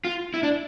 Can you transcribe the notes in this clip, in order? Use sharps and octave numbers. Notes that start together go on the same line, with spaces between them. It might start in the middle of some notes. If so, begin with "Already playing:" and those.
F4
E4
D4